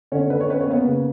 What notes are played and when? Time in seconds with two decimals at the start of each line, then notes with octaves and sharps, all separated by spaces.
0.12 D3 C#4 C#5
0.30 D3 B4
0.40 C#5
0.49 C#4 B4
0.61 C#5
0.67 A#3 B3 B4
0.85 C#3